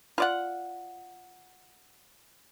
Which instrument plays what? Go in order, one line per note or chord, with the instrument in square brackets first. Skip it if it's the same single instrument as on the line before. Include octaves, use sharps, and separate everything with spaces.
[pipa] F4 D5 F#5